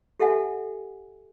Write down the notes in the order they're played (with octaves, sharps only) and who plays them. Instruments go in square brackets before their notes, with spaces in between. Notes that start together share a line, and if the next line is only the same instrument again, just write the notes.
[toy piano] G4 A4 E5 F#5 G#5